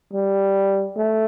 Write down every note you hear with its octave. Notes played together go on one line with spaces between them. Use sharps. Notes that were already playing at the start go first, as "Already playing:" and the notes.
G3
A3